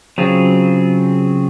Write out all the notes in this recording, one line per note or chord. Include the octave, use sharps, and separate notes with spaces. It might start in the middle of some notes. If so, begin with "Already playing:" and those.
C#3 F#3 C4 F4 G#4